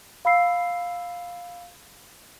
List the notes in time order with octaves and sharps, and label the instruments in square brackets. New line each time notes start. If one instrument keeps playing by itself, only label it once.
[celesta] F5 B5 E6 C7